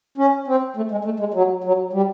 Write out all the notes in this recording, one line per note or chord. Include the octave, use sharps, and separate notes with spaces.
C#4
C4
A3
G#3
A3
G#3
F#3
F#3
G3